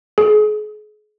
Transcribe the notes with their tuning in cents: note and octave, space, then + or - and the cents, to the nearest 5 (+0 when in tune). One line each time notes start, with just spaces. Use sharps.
G#4 +35